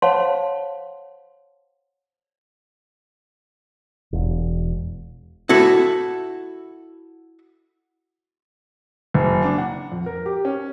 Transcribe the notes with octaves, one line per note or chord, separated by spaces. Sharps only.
C5 C#5 F5 F#5 A5 C6
E1
E4 F#4 A4
F#1
D4
F#5
F2
A#4
G4
C#4